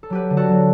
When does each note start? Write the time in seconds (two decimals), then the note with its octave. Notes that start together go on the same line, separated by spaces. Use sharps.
0.03 A4
0.10 F#3 G4 B4
0.30 D3
0.37 F#4 A4
0.49 F#3